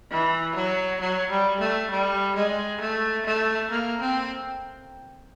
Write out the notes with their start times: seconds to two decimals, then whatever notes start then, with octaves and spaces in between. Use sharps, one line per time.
0.10 E3
0.55 F#3
1.00 F#3
1.30 G3
1.60 A3
1.91 G3
2.36 G#3
2.81 A3
3.26 A3
3.71 A#3
4.00 C4